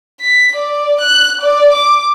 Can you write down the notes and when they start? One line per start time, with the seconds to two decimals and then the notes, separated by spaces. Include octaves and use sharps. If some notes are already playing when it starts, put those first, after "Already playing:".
0.21 B6
0.56 D5
1.01 F#6
1.42 D5
1.73 D6